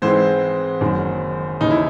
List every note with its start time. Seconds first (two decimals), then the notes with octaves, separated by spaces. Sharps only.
0.02 G#2 E3 G#3 C4 C5
0.81 F#1 F#2 D#3
1.61 D#2 C#3 E3 D#4
1.71 E4